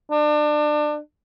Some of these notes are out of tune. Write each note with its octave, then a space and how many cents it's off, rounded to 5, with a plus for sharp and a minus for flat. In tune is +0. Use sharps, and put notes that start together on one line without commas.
D4 +30